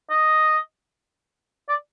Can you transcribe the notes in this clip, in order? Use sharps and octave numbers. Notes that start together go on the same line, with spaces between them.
D#5
D5